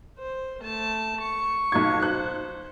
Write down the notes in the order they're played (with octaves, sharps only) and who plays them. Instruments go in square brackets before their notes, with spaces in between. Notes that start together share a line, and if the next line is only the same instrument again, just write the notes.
[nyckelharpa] C5
A3 A5
C#6
[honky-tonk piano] B1 F4 G#6
[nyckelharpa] C5 [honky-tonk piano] F#6